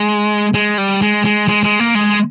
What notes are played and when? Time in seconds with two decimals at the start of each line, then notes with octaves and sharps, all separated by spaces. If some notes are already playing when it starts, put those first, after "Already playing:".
Already playing: G#3
0.54 G#3
0.78 G3
1.02 G#3
1.25 G#3
1.48 G#3
1.64 G#3
1.80 A#3
1.95 G#3